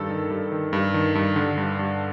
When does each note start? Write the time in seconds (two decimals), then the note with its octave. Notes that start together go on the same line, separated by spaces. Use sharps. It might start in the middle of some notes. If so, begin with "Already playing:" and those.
Already playing: G2 D#3 A4
0.10 D#3
0.30 G2
0.52 D#3
0.73 G2
0.94 D#3
1.15 G2
1.36 D3
1.57 G2
1.79 G2